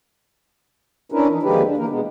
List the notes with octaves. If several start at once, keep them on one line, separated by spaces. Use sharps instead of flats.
C#4 D4 E4 A#4 B4
E3 D#4
D#2 D3 F3 G#3 G4 B4
D4
E3 A#3 A#4
B2 G#3 B3